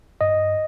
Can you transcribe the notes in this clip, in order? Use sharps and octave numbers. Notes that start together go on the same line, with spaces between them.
G2 D#5